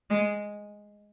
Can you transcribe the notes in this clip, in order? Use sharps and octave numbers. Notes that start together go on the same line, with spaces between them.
G#3